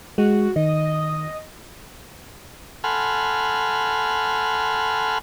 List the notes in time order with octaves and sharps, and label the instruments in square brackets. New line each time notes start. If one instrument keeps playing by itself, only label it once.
[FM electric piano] G#3 [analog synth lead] F#4
[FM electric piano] D#3 [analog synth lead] D#5
[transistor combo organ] A4 F#5 G#5 B5 C6 F6